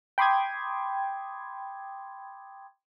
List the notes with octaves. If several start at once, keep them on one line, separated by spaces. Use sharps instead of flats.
G5 B5 C6 D6 D#6 G#6